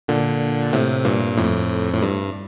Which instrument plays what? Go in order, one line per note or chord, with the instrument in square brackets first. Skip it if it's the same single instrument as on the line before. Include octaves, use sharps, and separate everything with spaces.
[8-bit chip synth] A#2 D3
A2 C3
G2 A#2
F2 A2
A2
G2